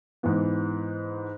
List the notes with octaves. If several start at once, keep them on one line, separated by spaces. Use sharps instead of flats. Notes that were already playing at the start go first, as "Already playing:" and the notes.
G#2 E3 B3